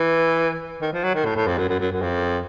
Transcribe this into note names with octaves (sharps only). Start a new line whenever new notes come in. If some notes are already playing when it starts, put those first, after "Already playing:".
Already playing: E3
D#3
F3
F#3
D#3
A2
A2
F2
F#2
F#2
F#2
F#2
F2